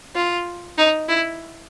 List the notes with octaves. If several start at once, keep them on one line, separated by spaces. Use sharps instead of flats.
F4
D#4
E4